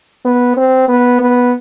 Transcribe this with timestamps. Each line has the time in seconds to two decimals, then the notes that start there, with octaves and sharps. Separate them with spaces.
0.25 B3
0.57 C4
0.88 B3
1.20 B3